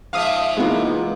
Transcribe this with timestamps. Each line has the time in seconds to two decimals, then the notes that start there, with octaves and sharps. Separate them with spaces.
0.13 G#2 F3 E5 F5 D#6
0.57 C3 E3 G#3 A#3 B3 D#4 F4